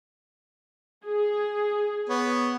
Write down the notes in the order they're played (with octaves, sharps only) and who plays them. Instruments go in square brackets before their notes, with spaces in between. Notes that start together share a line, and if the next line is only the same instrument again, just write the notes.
[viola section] G#4
[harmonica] B3 C#5